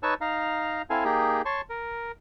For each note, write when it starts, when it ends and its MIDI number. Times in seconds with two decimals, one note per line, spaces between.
0.03 0.14 63
0.03 0.14 71
0.03 0.14 73
0.03 0.14 81
0.03 0.14 85
0.03 0.14 88
0.21 0.82 63
0.21 0.82 77
0.21 0.82 82
0.90 1.04 60
0.90 1.04 64
0.90 1.04 69
0.90 1.04 77
0.90 1.04 80
1.04 1.42 58
1.04 1.42 63
1.04 1.42 67
1.04 1.42 68
1.45 1.61 73
1.45 1.61 81
1.45 1.61 84
1.45 1.61 85
1.70 2.12 70